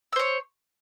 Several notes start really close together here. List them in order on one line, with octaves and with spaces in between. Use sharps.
E6 C5 C#5